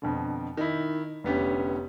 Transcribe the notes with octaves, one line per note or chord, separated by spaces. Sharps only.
F2 B2 D3
D#3 D#4 E4
F1 D3 B3 C#4 G4